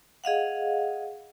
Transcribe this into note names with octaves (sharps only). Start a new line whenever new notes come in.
G#4 D#5 F5 F#5